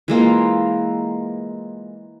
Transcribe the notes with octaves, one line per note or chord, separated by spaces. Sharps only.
E3 G#3 A#3 F4